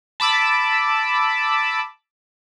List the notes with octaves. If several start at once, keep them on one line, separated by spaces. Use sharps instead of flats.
A5 B5 D6 E6